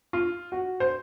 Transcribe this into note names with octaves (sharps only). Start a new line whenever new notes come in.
F4
F#4
C5